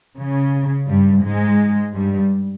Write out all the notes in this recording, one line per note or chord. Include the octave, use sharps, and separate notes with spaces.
C#3
G2 G3
G#2 G#3
G2 G3